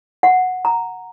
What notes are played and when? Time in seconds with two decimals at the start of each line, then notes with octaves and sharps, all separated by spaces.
0.23 F#5
0.65 A#5